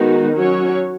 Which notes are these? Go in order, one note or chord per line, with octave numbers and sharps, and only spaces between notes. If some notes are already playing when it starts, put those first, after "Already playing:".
Already playing: D#3 G#3 B3 D#4 F#4
F#3 C#4 F#4 C#5